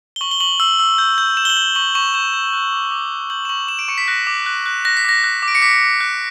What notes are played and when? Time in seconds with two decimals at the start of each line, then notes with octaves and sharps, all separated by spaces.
0.16 G7
0.21 C#6 F#7
0.31 G7
0.40 C#6 F#7
0.60 E6 F#7
0.79 E6
0.98 G6
1.18 G6
1.37 G6 E7
1.45 G7
1.50 F#7
1.57 G6
1.63 G7
1.75 C#6 F#7
1.95 C#6 E7
2.14 G6 E7
2.34 G6
2.53 F#6
2.72 D6
2.91 D6
3.12 F#6
3.30 G6 F#7
3.45 E7
3.49 C#6 F#7
3.69 C#6 E7
3.79 D7
3.88 C#6 C#7
3.98 B6
4.08 F#6 A#6
4.27 D6
4.46 F#6
4.66 F#6
4.85 F#6 A#6
4.97 B6
5.04 D6 A#6
5.24 F#6
5.43 D6
5.48 D7
5.55 C#7
5.62 D6 B6
5.82 D6
6.01 F#6